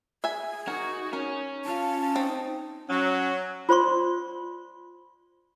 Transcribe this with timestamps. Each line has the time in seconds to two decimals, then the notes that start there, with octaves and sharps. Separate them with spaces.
0.24 G#4 E5 G#5
0.68 D#4 F#4 A#4
1.13 C#4 A#4
1.65 F4 F5 A5
2.16 C4 D#4
2.89 F#3 C#4
3.69 F4 C5 D5 C6 C#6